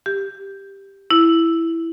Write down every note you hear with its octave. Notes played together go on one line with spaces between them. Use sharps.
G4
E4